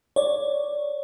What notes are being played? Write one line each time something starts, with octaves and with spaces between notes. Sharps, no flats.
C#5 D5